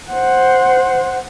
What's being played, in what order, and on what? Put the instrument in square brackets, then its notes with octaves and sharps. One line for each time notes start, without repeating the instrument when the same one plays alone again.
[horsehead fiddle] C5 F#5